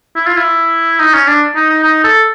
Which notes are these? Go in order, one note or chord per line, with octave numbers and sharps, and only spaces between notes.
E4
F4
E4
D#4
C#4
D4
D#4
D#4
D#4
A4